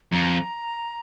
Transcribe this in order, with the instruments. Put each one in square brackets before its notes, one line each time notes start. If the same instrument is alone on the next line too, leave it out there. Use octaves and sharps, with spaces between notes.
[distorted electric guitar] F2 [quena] A#5